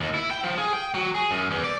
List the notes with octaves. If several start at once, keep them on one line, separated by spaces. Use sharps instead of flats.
D#2
E4
G5
F3
G#4
G5
F#3
G#4
F#2
E2
D5